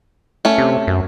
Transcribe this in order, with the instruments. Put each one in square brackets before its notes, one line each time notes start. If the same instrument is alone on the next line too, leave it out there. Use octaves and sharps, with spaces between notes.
[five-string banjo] A3 C#4
[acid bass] C3
F#2